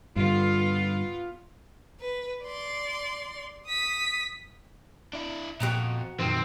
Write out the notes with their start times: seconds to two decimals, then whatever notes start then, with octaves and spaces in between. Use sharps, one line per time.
0.16 G2 D3 B3 F4
2.00 B4
2.44 D5 C6
3.67 D#6 B6
5.13 D4 E4
5.60 F2 A#2 B3 F#4 G5 A#5
6.19 F2 A#2 D#3 F3 F#3 C4